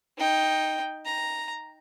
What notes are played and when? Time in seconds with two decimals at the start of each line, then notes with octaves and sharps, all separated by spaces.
0.18 D#4 G5
1.05 A#5